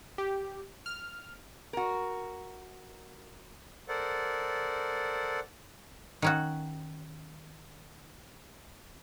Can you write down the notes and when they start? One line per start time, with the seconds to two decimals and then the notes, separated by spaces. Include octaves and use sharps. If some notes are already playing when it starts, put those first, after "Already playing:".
0.18 G4
0.86 F6
1.73 F#4 A#4
3.88 A4 A#4 C5 D5 F#5
6.22 D#3 C#4 F#4